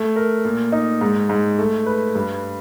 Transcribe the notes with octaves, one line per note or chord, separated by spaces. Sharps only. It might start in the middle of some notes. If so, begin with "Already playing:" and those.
Already playing: A3
A#4
A#2
D#4
G#2
G#2
A3
B4
G2